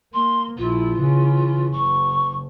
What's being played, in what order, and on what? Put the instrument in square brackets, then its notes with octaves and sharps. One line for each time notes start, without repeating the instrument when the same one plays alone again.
[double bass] A#3 [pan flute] C6
[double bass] A#1 E4 [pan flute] F4
[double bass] C#3 E3
[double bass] F#1 [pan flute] C#6